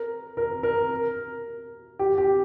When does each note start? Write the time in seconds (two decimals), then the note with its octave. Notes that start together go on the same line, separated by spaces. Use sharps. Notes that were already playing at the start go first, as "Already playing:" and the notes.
Already playing: A#4
0.37 A#4
0.63 A#4
1.99 G4
2.18 G4